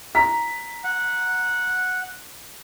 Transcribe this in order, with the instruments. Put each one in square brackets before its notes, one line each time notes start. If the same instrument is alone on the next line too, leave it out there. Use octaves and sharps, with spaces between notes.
[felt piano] A#5 B6
[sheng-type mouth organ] F#5